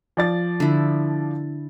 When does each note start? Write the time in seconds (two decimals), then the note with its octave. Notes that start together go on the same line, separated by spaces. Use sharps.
0.17 F3 D5 A6
0.60 D3 E4